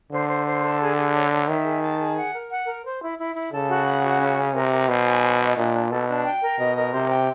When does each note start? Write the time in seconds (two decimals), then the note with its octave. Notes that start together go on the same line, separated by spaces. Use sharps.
0.12 D3 C5
0.29 C5
0.46 C5
0.63 A4
0.80 G#4
0.97 G#4
1.14 C#5
1.31 C#5
1.48 D#3 E5
1.65 G#4
1.82 A5
1.99 G#4
2.16 F#5
2.34 A#4
2.50 F#5
2.67 A#4
2.84 C5
3.01 E4
3.18 E4
3.35 E4
3.52 C#3 A4
3.69 F#4
3.87 F#5
4.03 F#4
4.20 C#4
4.37 C#4
4.55 C3 A#4
4.71 A#4
4.88 B2 C5
5.05 G#5
5.23 C5
5.40 D#5
5.57 A#2 D4
5.73 D4
5.91 B2 A4
6.07 D4
6.25 G5
6.41 A#4
6.59 B2 D#5
6.76 A#4
6.93 C3 C5
7.10 G5